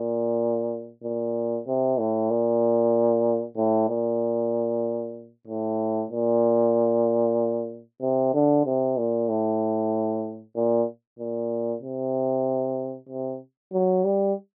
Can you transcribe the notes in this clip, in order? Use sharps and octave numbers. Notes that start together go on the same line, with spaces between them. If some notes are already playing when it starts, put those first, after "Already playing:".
Already playing: A#2
A#2
C3
A2
A#2
A2
A#2
A2
A#2
C3
D3
C3
A#2
A2
A#2
A#2
C3
C3
F#3
G3